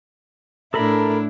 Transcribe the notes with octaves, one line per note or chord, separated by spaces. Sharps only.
A2 D4 E4 A4 A#4 B5